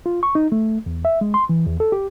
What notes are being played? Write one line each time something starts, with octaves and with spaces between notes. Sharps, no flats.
F4
C#6
D#4
A3
E2
E5
G#3
C6
E3
E2
A4
G4